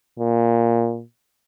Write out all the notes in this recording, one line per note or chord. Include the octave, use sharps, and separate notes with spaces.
A#2